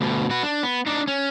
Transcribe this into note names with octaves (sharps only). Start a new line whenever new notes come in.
D2 B2
F#4 B4
D4
B3
D4 D#4
C#4